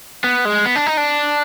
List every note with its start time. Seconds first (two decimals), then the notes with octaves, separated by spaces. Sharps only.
0.24 B3
0.45 G#3
0.66 B3
0.76 D4
0.86 D#4
0.97 D4